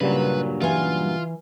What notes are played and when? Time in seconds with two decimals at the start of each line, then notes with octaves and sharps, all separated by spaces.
0.01 G2 A#2 C#3 F#3 G3 B4
0.61 E3 F4 G#5